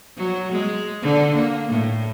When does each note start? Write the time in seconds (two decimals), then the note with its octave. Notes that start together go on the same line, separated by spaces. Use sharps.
0.17 F#3
0.52 G#3
1.02 D3
1.35 A#3
1.68 A2